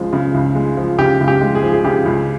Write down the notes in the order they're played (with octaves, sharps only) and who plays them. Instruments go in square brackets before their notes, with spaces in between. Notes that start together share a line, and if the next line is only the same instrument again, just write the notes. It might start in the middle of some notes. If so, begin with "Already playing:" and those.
Already playing: [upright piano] C#2 C#3 F3 G#3
C#3
C#2
G#3
F3
C#3 G4
C#2
G4
G#3
G#4
F3
G#4
C#3 G4
C#2